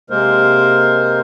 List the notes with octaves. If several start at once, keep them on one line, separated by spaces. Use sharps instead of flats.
C3 G#3 A#3 A#4 C5